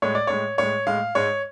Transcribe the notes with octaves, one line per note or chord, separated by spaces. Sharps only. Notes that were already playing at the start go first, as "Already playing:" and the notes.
A2 G#3 C#5
D5
A2 G#3 C#5
A2 G#3 C#5
A2 G#3 F5
G#2 G#3 C#5